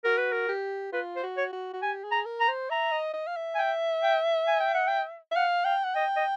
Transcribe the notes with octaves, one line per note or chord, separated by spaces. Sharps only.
F#4 A#4
B4
A#4
G4
F4 B4
C5
F#4
C#5
F#4
F#4
G4 G#5
G#4
A#5
A#4
A#5
C5
E5 A#5
D#5
D#5
F5
E5
G#5
G5
G5
G#5
G5
F#5
G5
E5
F5 F#5
F5 G5
F#5
D#5 G5
D#5